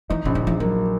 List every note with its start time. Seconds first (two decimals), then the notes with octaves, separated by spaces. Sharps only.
0.10 E3 D#4
0.25 A#1 C#3
0.35 D#3
0.43 A#1 E3
0.60 F#3 A#3